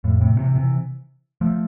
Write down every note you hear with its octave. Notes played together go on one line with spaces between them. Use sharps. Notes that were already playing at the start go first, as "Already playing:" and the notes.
F2 A2
A2 C3
C3 E3
C3 E3
F3 A3